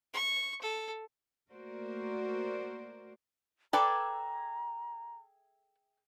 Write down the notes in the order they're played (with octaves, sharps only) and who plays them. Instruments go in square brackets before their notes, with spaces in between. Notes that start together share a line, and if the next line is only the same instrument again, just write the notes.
[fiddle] C#6
A4
[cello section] A3 A#3 F#4 A#4 C5 D5
[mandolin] G#4 E5 D6 [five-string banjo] A4 B4 D5 [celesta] G5 [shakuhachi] A#5